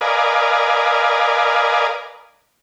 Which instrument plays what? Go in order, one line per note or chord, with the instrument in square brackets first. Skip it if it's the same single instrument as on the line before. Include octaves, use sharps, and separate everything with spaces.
[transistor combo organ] A#4 B4 D5 D#5 F5 G#5